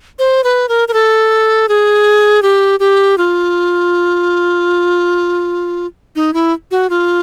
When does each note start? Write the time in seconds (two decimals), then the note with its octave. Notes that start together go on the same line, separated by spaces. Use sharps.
0.19 C5
0.44 B4
0.69 A#4
0.88 A#4
0.94 A4
1.69 G#4
2.42 G4
2.80 G4
3.18 F4
6.16 D#4
6.34 E4
6.71 F#4
6.90 F4